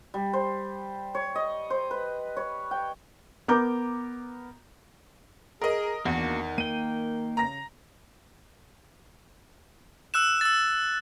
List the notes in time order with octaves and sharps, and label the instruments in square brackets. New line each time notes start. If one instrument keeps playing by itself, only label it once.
[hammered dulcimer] G3
C5
C#5
D#5
C5
B4
C#5
G5
[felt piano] B3 A#4 A#5 D6 G6
[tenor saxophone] G#4 [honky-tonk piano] A#4 D#5
[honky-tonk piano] E2 [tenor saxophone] D#3 [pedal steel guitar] A#3 D4 F#4
[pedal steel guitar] A#3 G5 [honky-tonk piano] D#7
[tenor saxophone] C#3 [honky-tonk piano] A#5 A#6
[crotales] E6 F#6 E7
E6 A6